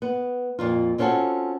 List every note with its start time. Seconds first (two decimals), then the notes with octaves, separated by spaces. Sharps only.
0.02 B3
0.59 F2 A#2 F4
0.98 C4 C#4 F4 F#4 A4 G#5